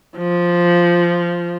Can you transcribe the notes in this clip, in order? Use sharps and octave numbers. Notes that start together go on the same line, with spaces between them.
F3